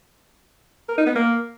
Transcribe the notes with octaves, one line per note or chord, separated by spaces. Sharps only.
A#4
D#4
B3
A#3